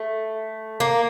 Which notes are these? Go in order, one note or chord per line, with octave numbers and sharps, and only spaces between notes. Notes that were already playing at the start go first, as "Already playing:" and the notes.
Already playing: A3
A#3